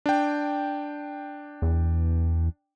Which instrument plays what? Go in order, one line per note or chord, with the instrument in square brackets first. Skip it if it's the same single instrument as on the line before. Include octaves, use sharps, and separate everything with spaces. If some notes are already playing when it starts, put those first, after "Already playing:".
[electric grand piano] D4 G5
[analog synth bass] E2